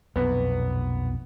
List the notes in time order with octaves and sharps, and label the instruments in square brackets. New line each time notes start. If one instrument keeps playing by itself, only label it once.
[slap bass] B1 F2 A#2 [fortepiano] B3